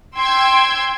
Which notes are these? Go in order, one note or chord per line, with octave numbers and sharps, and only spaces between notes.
G5 C6 E6 G#6